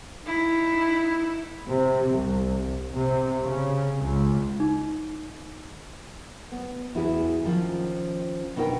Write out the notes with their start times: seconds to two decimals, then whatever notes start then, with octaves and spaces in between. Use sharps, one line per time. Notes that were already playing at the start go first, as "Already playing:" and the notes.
0.25 D#4 E4
1.66 C3
2.11 C2
2.95 C3
3.43 C#3
3.99 C#2
4.60 D#4
6.52 B3
6.95 E2 E4 F#4 G#4
7.44 D#3 F3 C#4
8.56 B2 D3 D#4 A#4 G5